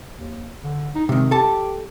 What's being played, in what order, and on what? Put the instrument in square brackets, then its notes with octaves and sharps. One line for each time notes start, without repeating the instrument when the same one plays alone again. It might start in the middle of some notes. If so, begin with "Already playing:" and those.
[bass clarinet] D#2
D3
D#4
[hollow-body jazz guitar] C3 D#3 [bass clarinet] G#3
[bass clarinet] G4 [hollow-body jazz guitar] A4 A5